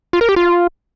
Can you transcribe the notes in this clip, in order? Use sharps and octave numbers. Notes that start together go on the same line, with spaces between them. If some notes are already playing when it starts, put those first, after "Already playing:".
F4
A#4
G4
F4